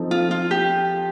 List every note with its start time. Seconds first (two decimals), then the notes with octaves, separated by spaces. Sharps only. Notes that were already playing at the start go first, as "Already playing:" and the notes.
Already playing: F3 C4 D#4 A4
0.11 F4
0.31 F4
0.51 G4